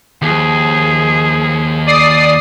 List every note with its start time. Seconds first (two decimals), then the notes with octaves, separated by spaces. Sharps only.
0.22 D#2 F3 G#4
1.87 D5 D#6 C7